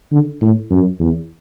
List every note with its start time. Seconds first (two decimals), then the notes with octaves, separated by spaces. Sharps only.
0.12 D3
0.41 A2
0.71 F#2
1.00 E2